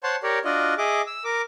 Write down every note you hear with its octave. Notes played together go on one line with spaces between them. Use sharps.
C5 C#5 F#5 A5 C6
G4 A#4 C#5 D5
D4 F4 F#4 D5 D#5
G#4 D#5 E5 D6
E6
A#4 D6